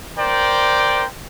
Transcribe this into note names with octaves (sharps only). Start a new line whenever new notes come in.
A#4 C5 D5 G5